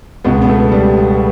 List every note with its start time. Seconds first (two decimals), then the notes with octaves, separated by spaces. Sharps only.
0.24 C#2 B2 B3
0.42 B3
0.48 A3
0.72 G3